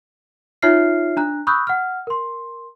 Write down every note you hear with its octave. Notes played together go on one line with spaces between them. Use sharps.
D#4 F4 C#5 E5 F6 C7
D4 A#5 F#6
B5 C#6 D#6 E6 F#6 G6
F#5 F6
A#4 C6